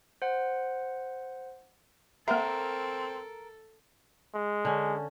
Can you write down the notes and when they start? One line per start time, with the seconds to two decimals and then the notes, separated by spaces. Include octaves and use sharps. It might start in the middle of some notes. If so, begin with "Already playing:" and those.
0.22 C5 F#5
2.28 A#3 C4 A4 A#4 E5
4.34 G#3
4.65 D3 C#4